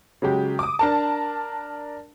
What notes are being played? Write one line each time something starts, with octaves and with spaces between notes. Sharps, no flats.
C#3 F#3 G#3 G4
D6 D#6
D4 A#4 A5